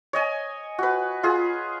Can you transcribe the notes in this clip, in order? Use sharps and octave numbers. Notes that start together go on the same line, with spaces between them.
C#5 D#5 G#5
F#4 B4
F4 G#4